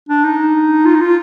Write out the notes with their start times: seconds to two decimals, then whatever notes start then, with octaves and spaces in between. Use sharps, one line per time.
0.09 D4
0.24 D#4
0.86 F4
0.95 D#4
1.01 F4